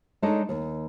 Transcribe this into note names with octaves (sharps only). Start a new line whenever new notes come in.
G#3 D4 D#4 A4 C#5 D#5
D#2